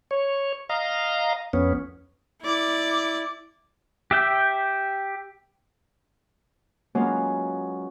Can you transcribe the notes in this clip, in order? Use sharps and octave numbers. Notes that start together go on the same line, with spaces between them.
C#5
D#5 F5 A#5
F2 B3 C#4
E4 D5
G4 E5 G5
F#3 G#3 A#3 B3 C#4 F4